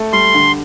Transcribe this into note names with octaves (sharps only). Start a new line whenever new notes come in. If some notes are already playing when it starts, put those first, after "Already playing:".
Already playing: A3
G3 C6
D3